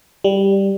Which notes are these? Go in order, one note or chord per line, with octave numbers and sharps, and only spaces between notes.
G3